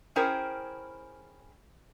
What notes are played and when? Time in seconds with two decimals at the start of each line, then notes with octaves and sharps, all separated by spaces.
0.16 C#4 E4 G#4 A#4 C5 G5